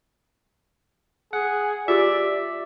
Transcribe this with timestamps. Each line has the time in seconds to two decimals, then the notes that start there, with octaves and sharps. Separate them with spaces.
1.33 G#4 F#5
1.88 F4 G4 D5 E5 E6